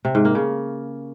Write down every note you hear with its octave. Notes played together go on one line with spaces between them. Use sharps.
C3
G#2
A#3
C#3